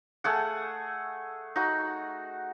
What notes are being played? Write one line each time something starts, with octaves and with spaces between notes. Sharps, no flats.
A3 G#4 F#5
D#4 F#4